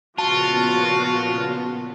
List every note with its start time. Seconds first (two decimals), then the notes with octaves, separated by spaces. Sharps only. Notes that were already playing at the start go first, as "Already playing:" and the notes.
0.18 A#2 C#3 F3 B3 F4 F#4 A5